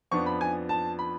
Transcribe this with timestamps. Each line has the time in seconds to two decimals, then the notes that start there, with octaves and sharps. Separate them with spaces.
0.11 F2 F3 B3 D4 C#6
0.26 B5
0.41 G#5
0.69 A5
0.99 B5